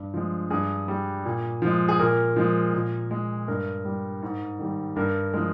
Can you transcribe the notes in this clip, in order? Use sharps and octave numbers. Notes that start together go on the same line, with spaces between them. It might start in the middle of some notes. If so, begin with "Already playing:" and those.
Already playing: G2
F3 G#3
G2 G#4
G3
A#2
F3 G#3
G#4
A#2 A#4
F3 G#3
A#2
G#3
G2 A#4
G3
G#2
D#3 G3
G2 A#4
F3 G#3 A#4